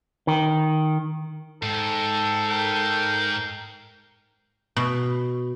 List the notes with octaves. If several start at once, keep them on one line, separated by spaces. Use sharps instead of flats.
D#3
G#2 A4 G5
A#4 G5
B2